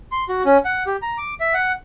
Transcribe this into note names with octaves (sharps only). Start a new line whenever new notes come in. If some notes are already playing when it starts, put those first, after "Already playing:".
C6
F#4
C#4
F#5
G4
A#5
D6
E5
F#5